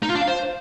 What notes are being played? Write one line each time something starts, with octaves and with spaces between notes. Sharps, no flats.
D#4
F4
D4
F5
C5